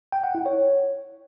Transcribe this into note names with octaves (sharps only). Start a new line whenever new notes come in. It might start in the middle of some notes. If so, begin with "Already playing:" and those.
G5
F#5
E4
C#5